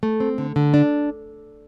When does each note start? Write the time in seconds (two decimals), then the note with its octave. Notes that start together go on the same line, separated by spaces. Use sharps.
0.03 A3
0.20 C4
0.38 D3
0.56 D3
0.74 D4